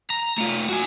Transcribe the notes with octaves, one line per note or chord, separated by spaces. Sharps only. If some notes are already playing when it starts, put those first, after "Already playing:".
A#5
A3 F4
F#4 G#5